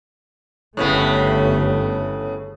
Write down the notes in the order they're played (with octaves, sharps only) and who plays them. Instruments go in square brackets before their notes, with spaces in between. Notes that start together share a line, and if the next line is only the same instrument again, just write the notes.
[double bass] G1 A3 [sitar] A2 C#3 B3